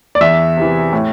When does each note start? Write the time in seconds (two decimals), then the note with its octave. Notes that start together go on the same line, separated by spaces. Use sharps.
0.15 D5
0.21 E2 E5
0.57 C3 E3
0.93 A2